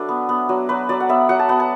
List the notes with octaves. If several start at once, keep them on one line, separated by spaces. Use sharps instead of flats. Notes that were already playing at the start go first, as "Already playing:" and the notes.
Already playing: F#3 D4 A4 B4 E5
B3
B3
F#3
F#3 B4
F#3 D5
F#5
B3 E5
F#3 F#5
A5
B3 F#5
A5